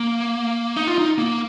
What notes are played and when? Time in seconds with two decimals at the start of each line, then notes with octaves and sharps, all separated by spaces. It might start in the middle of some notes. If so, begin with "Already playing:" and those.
Already playing: A#3
0.76 D#4
0.87 F4
0.98 D#4
1.18 A#3